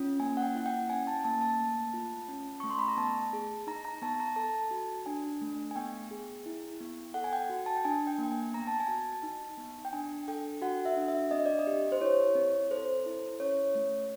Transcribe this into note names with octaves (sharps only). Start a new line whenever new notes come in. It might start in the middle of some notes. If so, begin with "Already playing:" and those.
Already playing: C#4 F4
A#3 G#5
F#5
G5
E4 F#5
G5
C#4 G#5
A5
A#3 A5
A5
A3
F4
C#4
A3 C#6
C6
B5
A#5
B3 A5
G#4
D#4 A#5
A#5
B3 A5
A#5
A4 A5
F#4
D4 G#5
A3
G#5
B3 G5
G#4
E4
B3
A4 F#5
G#5
G5
F#4
A5
G5
D4 G#5
G5
A#3 G5
G#5
B3 A#5
A5
G#5
F#4 A5
D#4
B3
G5
D4 G#5
A4 G5
F#4 F#5
E5
D4
E5
C4 D#5
D5
D#5
G4
C5
E4 C#5
C4
A4 C5
E4
C#4 C#5
A3